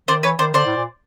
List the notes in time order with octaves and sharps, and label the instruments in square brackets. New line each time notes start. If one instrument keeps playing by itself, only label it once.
[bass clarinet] D#3 [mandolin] C5 D5
[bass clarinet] E3 [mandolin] B4 C#5
[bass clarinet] D#3 [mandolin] C5 D5
[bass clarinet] D3 [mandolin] C5 D5
[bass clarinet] A2
A#2